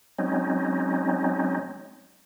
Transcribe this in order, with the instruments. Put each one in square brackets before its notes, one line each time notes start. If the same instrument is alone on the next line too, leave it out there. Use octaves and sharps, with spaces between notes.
[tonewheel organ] F#3 G#3 C4 C#4 D#4